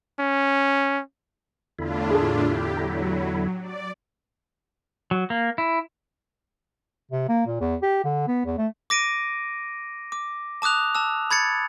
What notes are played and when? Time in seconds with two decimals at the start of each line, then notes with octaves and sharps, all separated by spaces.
0.20 C#4
1.79 E2 A2 D3 D4 E4 F4
2.11 G#4 A4
2.45 G4
2.77 F#3 A#5
3.61 D5
5.11 F#3
5.30 A#3
5.58 E4
7.12 C3
7.29 A#3
7.47 A#2
7.61 E2
7.82 G4
8.05 D3
8.28 B3
8.46 E2
8.58 A3
8.90 D6 A#6 D7 D#7
10.12 D6
10.62 A5 D6 D#6 F#6 F7
10.95 A5 E6
11.31 B5 G#6 A6 C#7